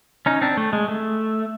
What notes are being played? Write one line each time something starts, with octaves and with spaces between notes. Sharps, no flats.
C#4 D#4
C4 D4
A3
G#3
A3